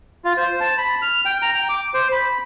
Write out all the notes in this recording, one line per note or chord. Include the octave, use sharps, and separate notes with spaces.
F4
C5
A5
B5
F6
G5
A#5
G5
D6
C5
B5